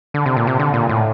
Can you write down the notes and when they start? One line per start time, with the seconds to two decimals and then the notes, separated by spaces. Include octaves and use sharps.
0.14 D3
0.26 C3
0.37 A#2
0.47 C3
0.59 D3
0.74 A#2
0.89 A2